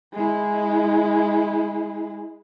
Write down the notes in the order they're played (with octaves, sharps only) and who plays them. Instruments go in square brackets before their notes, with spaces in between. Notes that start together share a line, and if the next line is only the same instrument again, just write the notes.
[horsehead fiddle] G#3 E4